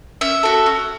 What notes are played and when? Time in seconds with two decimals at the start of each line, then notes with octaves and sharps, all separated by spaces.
0.21 C#4 E5
0.43 F#4 A4
0.66 C#4